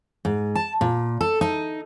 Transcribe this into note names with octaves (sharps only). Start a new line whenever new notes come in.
G#2
A5
A#2
A4
D#4